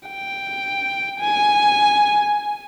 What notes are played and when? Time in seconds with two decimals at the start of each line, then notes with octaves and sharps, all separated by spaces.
0.09 G5
1.20 G#5